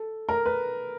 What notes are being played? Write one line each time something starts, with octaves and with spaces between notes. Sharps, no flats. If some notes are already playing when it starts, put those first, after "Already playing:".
Already playing: A4
A#4
B4